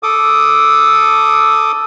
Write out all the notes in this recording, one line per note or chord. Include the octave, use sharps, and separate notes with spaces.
A4 D6 D#6